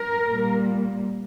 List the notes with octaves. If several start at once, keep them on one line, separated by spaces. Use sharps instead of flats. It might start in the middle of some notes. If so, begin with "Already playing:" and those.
Already playing: A#4
A#2 G3 A#3